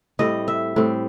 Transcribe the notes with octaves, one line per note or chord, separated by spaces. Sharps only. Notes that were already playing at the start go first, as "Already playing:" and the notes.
A2 G3 C4 D#5
E5
A2 G3 C4